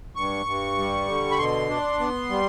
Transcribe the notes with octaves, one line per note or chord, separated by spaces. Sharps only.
G2 C#6
G2
G3
D3
B5
B2 C6
D4
B3
G3